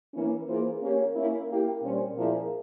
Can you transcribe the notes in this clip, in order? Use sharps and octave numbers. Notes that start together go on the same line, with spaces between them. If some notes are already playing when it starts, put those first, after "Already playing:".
E3 A#3 C#4 E4
E3 A#3 F4 G#4 C5
A#3 C#4 G4 C#5
A#3 C#4 E4
A#3 E4 G4
A#2 G3 C#4 G4 C5
A#2 F3 A#3 E4 G#4